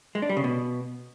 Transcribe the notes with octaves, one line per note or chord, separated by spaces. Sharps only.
G#3
D4
G3
C#3
B2